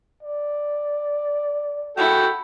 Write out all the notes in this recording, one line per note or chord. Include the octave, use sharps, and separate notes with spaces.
D5
E4 F#4 A4 G5